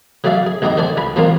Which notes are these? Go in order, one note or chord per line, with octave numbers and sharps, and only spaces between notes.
F#3 A3 G#4 D5 E5 F5
G#4
D2 G2 D3 D#4 G4 D#5
D3 A3 C5 D5 G#5
C#2 G#4 B5
A#2 E3 G#3 C4 F4 A#4